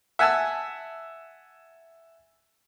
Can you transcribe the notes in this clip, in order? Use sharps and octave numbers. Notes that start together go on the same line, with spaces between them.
E5 F#5 G#5 A5 E6